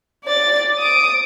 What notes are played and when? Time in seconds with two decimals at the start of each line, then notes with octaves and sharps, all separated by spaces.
0.24 D5 A6
0.79 D#6 D7